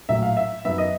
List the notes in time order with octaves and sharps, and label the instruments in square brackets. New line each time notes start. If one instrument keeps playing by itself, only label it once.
[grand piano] A#1 A2 F#3 E5
F5
E5
F#2 D#3 F#3 B3 E5
D#5